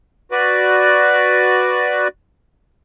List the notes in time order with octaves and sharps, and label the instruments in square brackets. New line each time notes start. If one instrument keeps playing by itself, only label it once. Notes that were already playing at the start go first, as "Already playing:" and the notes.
[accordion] F#4 B4 D5